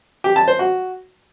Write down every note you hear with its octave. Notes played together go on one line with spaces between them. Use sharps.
G4
A5
C5
F#4